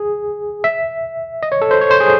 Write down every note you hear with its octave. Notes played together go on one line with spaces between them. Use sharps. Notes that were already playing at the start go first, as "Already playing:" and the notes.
Already playing: G#4
E5
D#5
C#5
A4
C5
C#5
C5
G#4